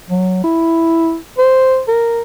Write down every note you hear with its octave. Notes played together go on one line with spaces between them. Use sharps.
F#3
E4
C5
A#4